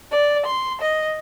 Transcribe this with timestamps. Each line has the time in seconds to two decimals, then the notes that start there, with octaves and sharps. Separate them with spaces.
0.12 D5
0.46 C6
0.81 D#5